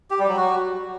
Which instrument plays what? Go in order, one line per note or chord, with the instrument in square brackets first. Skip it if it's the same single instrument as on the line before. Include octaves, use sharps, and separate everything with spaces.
[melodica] G4
G3
F#3
F#4